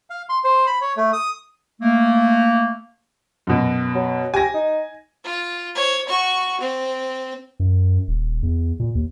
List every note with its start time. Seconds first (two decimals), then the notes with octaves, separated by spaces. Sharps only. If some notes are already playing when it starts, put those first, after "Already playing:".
0.10 F5
0.29 C6
0.44 C5
0.67 B5
0.81 C#5
0.97 A3
1.13 D#6
1.81 A3 A#3
3.47 F#2 B2
3.95 F#3
4.34 G4 G#5 A#6
4.54 D#4
5.24 F4
5.75 C5 C#5
6.07 F#4 C#6
6.60 C4
7.60 F#2
8.08 D#1
8.43 E2
8.80 A#2
8.95 D#2